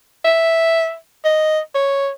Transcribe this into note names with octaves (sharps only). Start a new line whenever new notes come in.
E5
D#5
C#5